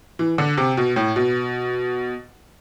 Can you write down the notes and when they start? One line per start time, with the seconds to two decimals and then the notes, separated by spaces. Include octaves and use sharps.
0.19 E3
0.38 D3
0.57 C3
0.77 B2
0.96 A2
1.16 B2